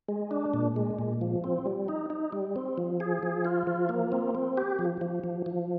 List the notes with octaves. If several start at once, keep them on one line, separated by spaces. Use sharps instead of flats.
G#3
D4
A#2
G#3
A#2
F3
C4
G3
D#4
D#4
G3
C4
F3
G#4
F3
F4
F3
A#3
C4
C4
G4
F3
F3
F3
F3